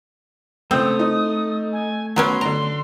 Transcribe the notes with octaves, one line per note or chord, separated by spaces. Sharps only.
C#2 A3 C4 D#6 E6
D#4
G#5
F#3 B3 C#4 F#4 A#5 C6 D7
D3 A#5 D7